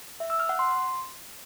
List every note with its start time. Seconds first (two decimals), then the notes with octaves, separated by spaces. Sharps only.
0.20 E5
0.30 E6
0.40 F6
0.49 F#5
0.59 C6